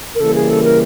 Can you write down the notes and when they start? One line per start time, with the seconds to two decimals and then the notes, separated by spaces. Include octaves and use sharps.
0.15 A#4
0.20 C#3 E3 G3 A#3 A4
0.35 G#4
0.50 A4
0.64 A#4